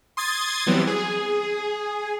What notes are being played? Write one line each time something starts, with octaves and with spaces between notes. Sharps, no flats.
C6 D#6 G#6 A6
E3 F#3 G3 B3 C4
G#4